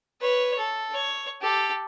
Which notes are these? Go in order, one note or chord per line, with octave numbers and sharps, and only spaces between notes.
B4 C#5
A4
C#5
G4 A4